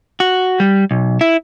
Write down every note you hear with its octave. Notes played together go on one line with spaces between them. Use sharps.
F#4
G3
B1
E4